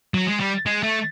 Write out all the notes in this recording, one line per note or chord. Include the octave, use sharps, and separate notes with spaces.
F#3
G#3
G3
G#3
A3